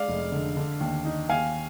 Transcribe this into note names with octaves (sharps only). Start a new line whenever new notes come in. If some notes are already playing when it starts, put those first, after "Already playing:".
Already playing: G#3 D5 F5
F1
D3
D3
D#2
D#4
D#2 F5 G#5